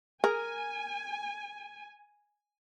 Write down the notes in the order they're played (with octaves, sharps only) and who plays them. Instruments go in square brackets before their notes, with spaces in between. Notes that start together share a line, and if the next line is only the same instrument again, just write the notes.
[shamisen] G#4 [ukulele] A#4 [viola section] G#5